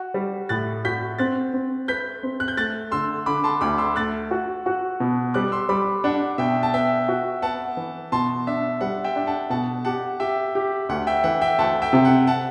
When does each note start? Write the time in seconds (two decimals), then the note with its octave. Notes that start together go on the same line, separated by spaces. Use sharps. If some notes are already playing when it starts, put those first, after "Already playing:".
Already playing: F#4
0.14 G3
0.49 A2 F#6 A6
0.85 F#4 G6 B6
1.18 C4 F#6 A6
1.54 C4
1.88 B4 G6 B6
2.23 C4
2.40 F#6
2.48 G6
2.57 A3 F#6 A6
2.92 D3 C6 E6
3.26 D3 B5 D6
3.44 A5 C6
3.61 D2 B5 D6
3.78 C6 E6
3.96 A3 F#6 A6
4.31 F#4
4.66 F#4
5.00 B2
5.34 G3 D6 F#6
5.52 C6 E6
5.69 G3 B5 D6
6.04 D4 F#5
6.38 B2 E5 G5
6.63 A5
6.73 B3 E5 G5
7.08 F#4
7.42 B3 F#5 A5
7.77 E3
8.12 B2 A5 C6
8.47 D4 E5
8.81 G3 F#5
9.04 E5 G5
9.16 D4
9.27 F#5 A5
9.50 B2 F#5 A5
9.85 G4 F#5 A5
10.20 G4 E5 G5
10.55 G4
10.89 D2 F#5
11.07 E5 G5
11.24 E3 F#5
11.41 E5 G5
11.58 D2 F#5 A5
11.82 E5 G5
11.93 C3
12.05 F#5
12.27 F#5 A5